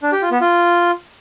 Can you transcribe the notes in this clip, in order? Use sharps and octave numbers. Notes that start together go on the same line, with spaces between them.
D4
G4
F4
B3
F4